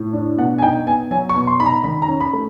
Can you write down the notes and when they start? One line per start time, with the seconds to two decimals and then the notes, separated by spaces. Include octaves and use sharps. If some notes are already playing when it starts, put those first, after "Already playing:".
Already playing: A2
0.13 D4
0.38 B2 F#5
0.58 G#5
0.62 D#4 G5
0.87 B3 G#5
1.11 F#3 G#5
1.29 C#6
1.36 B2
1.47 C6
1.60 D#4 B5
1.66 A#5
1.84 D#3 B5
2.02 A#5
2.08 C#4
2.20 B5
2.33 A3